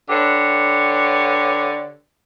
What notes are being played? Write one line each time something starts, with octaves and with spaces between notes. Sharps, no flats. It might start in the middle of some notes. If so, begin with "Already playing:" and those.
D3 G4 B4 C#5